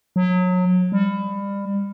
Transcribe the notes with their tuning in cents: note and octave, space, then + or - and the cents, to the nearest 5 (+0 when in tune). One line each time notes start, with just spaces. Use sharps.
F#3 -25
G3 +30